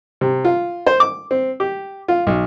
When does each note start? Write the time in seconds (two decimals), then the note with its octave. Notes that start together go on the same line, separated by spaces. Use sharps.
0.21 C3
0.45 F4
0.87 C5
1.00 D6
1.31 C4
1.60 G4
2.08 F4
2.27 B1